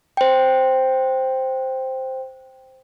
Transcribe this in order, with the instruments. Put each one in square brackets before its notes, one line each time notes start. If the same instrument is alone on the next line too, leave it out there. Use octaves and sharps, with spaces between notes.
[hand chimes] C5 G5